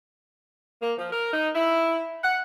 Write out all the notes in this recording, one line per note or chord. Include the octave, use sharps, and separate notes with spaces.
A#3
F3
A#4
D#4
E4
F#5